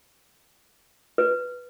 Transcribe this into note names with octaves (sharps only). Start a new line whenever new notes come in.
B4